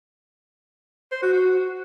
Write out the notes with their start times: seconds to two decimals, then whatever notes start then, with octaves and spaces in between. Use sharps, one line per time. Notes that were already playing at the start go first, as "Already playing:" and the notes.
1.12 C5
1.22 F#4
1.33 F#4